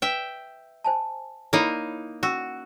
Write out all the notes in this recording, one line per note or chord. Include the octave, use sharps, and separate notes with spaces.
B4 E5 G5
C5 G#5 A5
A#3 D#4 E4 C#5 B5
C#4 F#4 E6